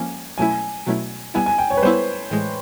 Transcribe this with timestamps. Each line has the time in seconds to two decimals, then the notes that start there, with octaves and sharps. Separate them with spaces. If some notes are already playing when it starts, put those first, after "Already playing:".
Already playing: F3 A#3 C#4 G#5
0.38 B2 F#3 A3 C#4 E4 G#5
0.86 B2 F#3 A3 C#4 E4
1.34 G3 B3 E4 G#5
1.46 G#5
1.58 G5
1.70 C#5
1.77 B4
1.82 G3 B3 E4 C5
2.31 A2 E3 G#3